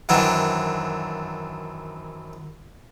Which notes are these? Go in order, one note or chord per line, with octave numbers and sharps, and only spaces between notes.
F#2 D#3 E3 F#3 C4 D4